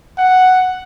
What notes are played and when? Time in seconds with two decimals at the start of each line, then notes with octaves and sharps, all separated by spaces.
0.18 F#5